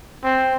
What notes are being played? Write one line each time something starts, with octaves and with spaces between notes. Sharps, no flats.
C4